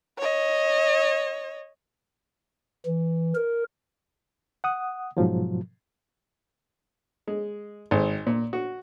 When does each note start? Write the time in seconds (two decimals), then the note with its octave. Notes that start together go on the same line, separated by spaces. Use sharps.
0.18 C#5 D#5
2.86 E3
3.35 A#4
4.64 F#5 D#6
5.17 G#2 B2 F3 F#3
7.27 G#3
7.91 G#1
8.27 A#2
8.53 F#4